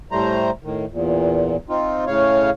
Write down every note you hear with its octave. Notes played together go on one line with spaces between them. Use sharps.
A2 G3 A3 C5 A#5
A2 D#3
E2 A#2
C4 D#4 F4
A2 C#3 C#5 F5